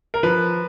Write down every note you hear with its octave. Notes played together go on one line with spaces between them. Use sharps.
A#4
F3 B4